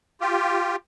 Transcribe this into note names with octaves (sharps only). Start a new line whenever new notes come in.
F4 G4